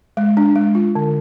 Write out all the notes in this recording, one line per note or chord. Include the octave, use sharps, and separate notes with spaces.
G#3
D4
G#3
F4
D3